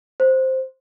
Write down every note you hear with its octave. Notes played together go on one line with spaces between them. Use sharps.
C5